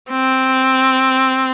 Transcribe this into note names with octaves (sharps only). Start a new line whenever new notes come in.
C4